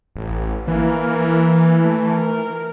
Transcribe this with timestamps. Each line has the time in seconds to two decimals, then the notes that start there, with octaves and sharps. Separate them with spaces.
0.16 A1
0.68 E3 A#3 A#4
1.81 A3
2.10 A#4